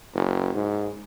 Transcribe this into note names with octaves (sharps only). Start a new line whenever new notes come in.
F#1
G#2